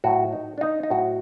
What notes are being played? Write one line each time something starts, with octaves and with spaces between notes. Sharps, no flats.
A2 F#3 F#4
D#4
D4
D#4
D#4
A2 F#3 F#4